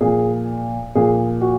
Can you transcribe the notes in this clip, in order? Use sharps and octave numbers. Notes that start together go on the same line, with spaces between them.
A#2 F3 G#4
A#2 F3 G#4
F#4